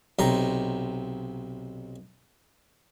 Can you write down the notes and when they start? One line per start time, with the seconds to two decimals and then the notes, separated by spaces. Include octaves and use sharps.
0.19 B1 C3 A#5